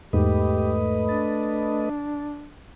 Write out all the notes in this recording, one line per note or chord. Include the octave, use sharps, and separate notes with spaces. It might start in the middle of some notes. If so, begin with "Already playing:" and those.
E2 G#2 A3 G4 B4 D#5
D4 A6